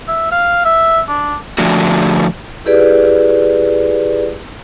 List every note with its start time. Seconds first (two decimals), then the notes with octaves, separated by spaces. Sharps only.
0.08 E5
0.32 F5
0.65 E5
1.08 D4
1.58 D3 F3 A3 D4 F#4
2.66 E4 G4 G#4 B4 D5